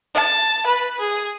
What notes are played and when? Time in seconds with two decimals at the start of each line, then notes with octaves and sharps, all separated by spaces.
0.14 A5
0.66 B4
1.00 G#4